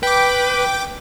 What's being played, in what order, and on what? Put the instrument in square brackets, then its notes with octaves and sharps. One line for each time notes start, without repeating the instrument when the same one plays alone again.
[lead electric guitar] B4 [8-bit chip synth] G5 D6